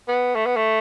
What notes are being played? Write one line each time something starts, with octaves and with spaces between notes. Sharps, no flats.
B3
A3
B3
A3